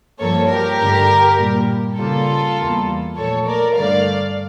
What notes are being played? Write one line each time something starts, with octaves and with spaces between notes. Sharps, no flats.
G2 F3 A#3 A4 C#5
G4 A#4
G2 D3 A3
A#2 G3 A#3
C#3 G3 A#3 F4 A4
E2 E3 G3 A#3
A#2 F3 A3 A4 C#5
A#4 D5
G2 D3 A3 D5 F5